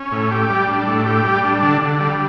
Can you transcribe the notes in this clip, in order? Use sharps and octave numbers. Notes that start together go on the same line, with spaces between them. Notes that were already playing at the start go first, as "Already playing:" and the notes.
Already playing: C#4
A2
G4
G3
D4
A2
G4
G3
D4
D3
D3
G3